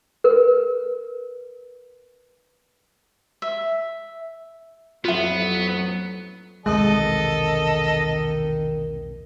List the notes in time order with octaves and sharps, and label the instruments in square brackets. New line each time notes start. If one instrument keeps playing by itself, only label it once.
[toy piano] A#4 B4
[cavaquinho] E5
[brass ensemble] A1 F2 [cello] F#3 [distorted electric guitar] B3 [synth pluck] F4 E5
[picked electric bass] B1 E2 C3 [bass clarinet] D#3 [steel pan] G#3 [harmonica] A4 D#5